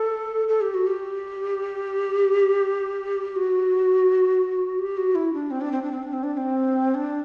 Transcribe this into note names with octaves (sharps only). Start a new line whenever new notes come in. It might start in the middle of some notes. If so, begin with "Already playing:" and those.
Already playing: A4
A4
G4
F#4
G4
F#4
G4
F#4
E4
D4
C4
D4
C4
D4
C4
D4
C4
D4
D4
C4
D4